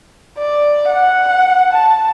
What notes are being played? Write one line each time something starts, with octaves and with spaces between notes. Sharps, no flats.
D5
F#5
A5